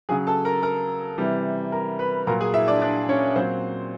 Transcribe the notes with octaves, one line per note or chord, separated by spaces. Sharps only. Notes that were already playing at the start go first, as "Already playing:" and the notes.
C#3 F#3 G#4 G#5
A4 A5
A#4 A#5
A#4 A#5
C3 E3 G3
A#4 A#5
B4 B5
A#2 F#3 A#4 A#5
G#4 G#5
E4 E5
D4 D5
D4 D5
C#4 C#5
A#2 F#3 C4 C5